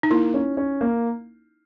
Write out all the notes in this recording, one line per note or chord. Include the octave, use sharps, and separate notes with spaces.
D#4
A#3 E4
C#4
C#4
A#3